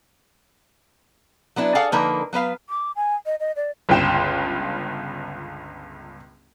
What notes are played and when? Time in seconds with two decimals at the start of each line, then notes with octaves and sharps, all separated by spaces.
1.56 F#3 B3 D4 E4
1.75 G#4 A4 D5 F5 F#5
1.92 D3 F3 A#3 D#4 A#4 B4
2.33 F#3 B3 B4 F5
2.69 D6
2.96 G#5
3.26 D#5
3.40 D#5
3.56 D5
3.89 G1 C#2 F4 G5 C6 E7